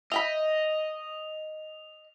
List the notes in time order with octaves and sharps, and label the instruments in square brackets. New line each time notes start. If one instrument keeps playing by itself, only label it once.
[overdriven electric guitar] D#5 [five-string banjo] E5 G5 B5 [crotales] F7